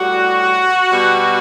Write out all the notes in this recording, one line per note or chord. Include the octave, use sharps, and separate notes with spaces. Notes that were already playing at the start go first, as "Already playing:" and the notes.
Already playing: A2 G3 F#4
B2 G3